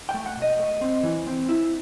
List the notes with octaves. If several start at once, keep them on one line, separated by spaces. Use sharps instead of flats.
G5
A3
F#5
B2
D#5
A3
C4
E3
C4
E4